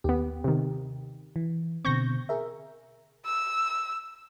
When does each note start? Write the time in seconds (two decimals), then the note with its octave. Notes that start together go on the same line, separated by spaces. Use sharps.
0.04 D#2 B3 G4
0.44 C3 D#3
1.36 E3
1.85 B2 D3 C4 C#6 G6 A#6
2.29 G#4 A#4 E5
3.26 E6